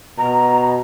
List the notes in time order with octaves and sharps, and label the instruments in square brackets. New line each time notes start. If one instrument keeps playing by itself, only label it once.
[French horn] B2 [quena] A#5